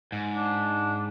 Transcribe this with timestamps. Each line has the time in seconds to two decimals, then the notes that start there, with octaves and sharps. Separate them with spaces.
0.12 G#2
0.35 D4